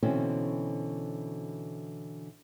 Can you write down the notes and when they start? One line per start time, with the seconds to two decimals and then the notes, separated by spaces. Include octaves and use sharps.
0.03 B2 D3 E3 C4 C#4 F#4